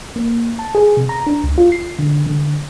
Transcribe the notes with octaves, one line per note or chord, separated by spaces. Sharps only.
A#3
A5
G#4
C3
A#5
D4
C#2
F4
C7
D3
D3